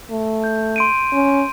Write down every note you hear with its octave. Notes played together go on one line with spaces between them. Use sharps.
A3
G6
C6 D7 D#7
C#4